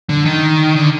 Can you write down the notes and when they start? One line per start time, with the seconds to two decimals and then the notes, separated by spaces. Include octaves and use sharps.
0.09 D3
0.25 D#3
0.76 D3